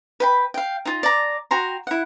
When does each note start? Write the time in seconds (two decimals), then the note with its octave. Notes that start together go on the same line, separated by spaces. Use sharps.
0.20 B4 G5 B5
0.54 F5 G5
0.85 D#4 F4
1.03 D5 A#5
1.51 F#4 G5 A#5 C6
1.87 E4 F#5